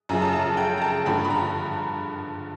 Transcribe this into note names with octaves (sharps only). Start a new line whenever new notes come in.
F#2 C#3 F3 G#5
A5
A5
G5
A#5
A5
G2 D3 F3 B5
B5
A#5